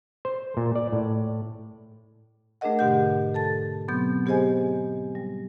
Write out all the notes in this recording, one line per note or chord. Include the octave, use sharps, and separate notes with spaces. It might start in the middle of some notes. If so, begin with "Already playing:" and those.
C5
A#2
D5
A2
A3 D4 G#4 A#4 D#5 F#5
G#2 B2 D3 G4 F#5 G6
A4 A5 A6
B2 F#3 B3 C4 G6
B3 G4 G#4 C5 D#5 G#5
G3